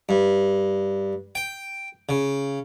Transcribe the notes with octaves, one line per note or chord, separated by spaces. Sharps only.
G2
G5
C#3